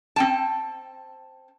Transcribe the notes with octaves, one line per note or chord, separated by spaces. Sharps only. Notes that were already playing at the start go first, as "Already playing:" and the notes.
C4 G5 A5